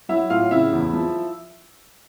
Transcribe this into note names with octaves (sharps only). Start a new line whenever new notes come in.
F#3 E4 E5
A2 F4 F5
C#3 E4 E5
E2
F3